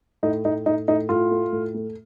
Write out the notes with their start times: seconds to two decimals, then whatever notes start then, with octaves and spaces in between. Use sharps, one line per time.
0.23 A2 D#4
0.45 A2 D#4
0.66 A2 D#4
0.88 A2 D#4
1.09 A2 F4
1.31 A3
1.52 A2
1.74 A3